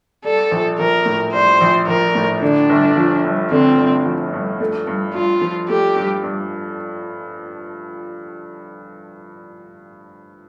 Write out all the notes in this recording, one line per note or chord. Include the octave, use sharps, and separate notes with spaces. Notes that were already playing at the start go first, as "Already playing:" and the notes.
G3 A4
A#1
A#1 A#4
A2
G3 C5
A#1
A#1 A#4
A2
D3 D4
G1
F3
G2
D3 C4
G1
F3
G2
A3
G2
G2 F4
F3
A3 G4
G2
G2